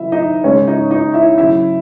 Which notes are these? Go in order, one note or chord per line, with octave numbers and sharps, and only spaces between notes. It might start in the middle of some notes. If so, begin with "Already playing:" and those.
Already playing: C#3 F#3 E4 E5
D#4 D#5
C#3 G#3 C#4 C#5
D#4 D#5
D#4 D#5
E4 E5
C#3 F#3 E4 E5